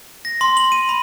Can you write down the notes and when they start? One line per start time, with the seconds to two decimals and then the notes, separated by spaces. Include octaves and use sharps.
0.25 A#6
0.41 C6
0.57 F#7
0.72 D#7
0.89 B5